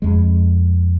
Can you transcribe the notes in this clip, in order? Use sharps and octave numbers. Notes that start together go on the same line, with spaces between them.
F2 G#3